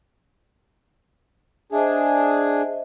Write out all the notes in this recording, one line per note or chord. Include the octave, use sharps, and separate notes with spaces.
D4 G#4 C5 D#5 E5